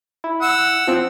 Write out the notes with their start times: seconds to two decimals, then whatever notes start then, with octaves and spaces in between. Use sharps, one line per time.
0.24 E4
0.42 F#5 E6
0.87 F3 C4